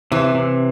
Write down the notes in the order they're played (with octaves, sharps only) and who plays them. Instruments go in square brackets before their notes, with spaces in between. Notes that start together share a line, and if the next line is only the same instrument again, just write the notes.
[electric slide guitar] C3 [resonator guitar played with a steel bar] E3
[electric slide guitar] C3